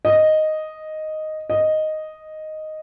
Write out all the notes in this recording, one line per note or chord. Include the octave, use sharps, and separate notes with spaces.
D#5
D#5